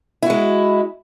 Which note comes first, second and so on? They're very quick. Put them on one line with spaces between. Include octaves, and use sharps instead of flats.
E4 F#4 G#3